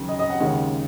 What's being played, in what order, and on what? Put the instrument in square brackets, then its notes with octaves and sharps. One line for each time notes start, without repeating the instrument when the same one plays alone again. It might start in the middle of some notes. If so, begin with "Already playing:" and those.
Already playing: [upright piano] D#2 C#3 F#3 C#4
D#5
D#5
F#5
D#2 C#3 G#3